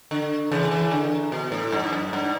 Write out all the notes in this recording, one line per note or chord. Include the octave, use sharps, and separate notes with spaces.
D3
C#3 E3
C#3 E3
D3
B2
A2
G2
F#2
G2